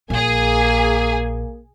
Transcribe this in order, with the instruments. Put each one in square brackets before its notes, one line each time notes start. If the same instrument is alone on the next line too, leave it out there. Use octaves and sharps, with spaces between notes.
[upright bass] A#1 [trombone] A#3 [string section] G#4 G#5